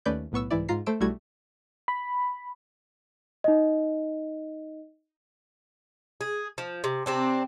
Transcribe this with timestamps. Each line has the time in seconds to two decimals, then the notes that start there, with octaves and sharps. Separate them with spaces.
0.05 D#2 A3 C#4 B4 D5 G6
0.32 B1 A2 B3 C#6 E6
0.51 C2 G#2 E3 E4 D5
0.69 G#2 F4 A#5 C7
0.86 A3 C5 E6 D7
1.00 B1 G3 A3 E4 F#4 G#6
1.88 B5
3.44 D#4 D#5
6.21 G#4
6.58 F3
6.84 C3
7.06 C3 C4 D4